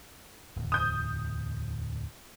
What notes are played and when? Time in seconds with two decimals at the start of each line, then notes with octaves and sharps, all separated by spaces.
0.56 D1 E2
0.72 D#6 G6